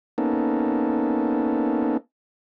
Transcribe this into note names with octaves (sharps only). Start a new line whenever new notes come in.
A#3 B3 C#4 D#4 A4